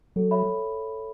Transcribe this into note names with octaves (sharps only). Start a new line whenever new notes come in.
F#3 A4
C#5 E5 B5